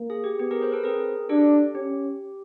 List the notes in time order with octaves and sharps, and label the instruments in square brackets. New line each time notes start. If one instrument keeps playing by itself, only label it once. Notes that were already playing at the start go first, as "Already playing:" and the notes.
Already playing: [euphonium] A#3
[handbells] G#4
G4
[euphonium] B3 [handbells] G4
[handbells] G#4 A#4
A#4 C5
A4 B4
[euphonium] C4 [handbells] G#4 A#4
[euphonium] D4 [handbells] G4 A4
[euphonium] C#4 [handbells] G4